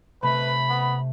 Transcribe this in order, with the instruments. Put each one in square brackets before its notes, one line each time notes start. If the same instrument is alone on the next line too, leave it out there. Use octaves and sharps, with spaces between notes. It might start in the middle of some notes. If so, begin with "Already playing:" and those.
[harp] C3 A3 [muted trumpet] B4 [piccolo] B5
[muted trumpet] B3